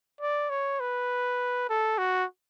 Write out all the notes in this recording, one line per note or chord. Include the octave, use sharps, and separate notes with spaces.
D5
C#5
B4
A4
F#4